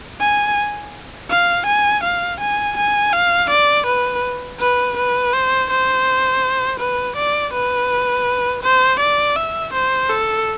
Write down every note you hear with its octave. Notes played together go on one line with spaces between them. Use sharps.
G#5
F5
G#5
F5
G#5
G#5
F5
D5
B4
B4
B4
C5
C5
B4
D5
B4
C5
D5
E5
C5
A4